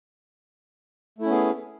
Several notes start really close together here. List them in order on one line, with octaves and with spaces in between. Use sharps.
A3 E4 C#4 B3 G#4